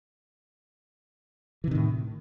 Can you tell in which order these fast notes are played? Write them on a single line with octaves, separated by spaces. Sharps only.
E3 C3 D#3 A2